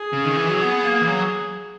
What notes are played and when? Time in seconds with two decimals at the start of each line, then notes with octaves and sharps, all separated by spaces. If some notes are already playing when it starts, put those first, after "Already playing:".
Already playing: G#4
0.13 C#3
0.25 D#3
0.37 E3
0.49 F#3
0.61 B3
0.85 A#3
1.01 E3
1.07 F#3